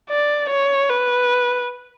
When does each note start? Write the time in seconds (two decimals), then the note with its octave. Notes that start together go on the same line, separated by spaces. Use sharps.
0.10 D5
0.50 C#5
0.89 B4